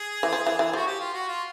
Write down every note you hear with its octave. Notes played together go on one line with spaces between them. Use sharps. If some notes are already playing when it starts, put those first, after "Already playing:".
Already playing: G#4
E3
F3
E3
E3
F3 F#4
G4
F4
F#4
F4